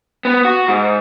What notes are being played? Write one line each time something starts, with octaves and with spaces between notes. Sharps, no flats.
B3
F#4
G#2